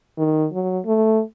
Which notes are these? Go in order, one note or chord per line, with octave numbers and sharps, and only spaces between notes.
D#3
F#3
A3